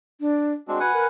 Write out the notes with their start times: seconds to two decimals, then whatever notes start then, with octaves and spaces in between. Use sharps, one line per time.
0.20 D4
0.68 G#3 C4 D4 F#4
0.80 B4 F#5 G#5
0.93 A#4